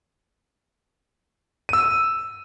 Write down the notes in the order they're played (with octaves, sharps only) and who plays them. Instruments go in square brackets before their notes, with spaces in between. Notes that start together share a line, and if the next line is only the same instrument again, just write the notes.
[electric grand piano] E6 D#7